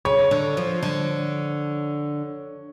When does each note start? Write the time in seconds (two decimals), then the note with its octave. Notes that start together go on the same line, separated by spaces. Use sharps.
0.05 C#3 C#5
0.31 D3
0.57 F3
0.83 D3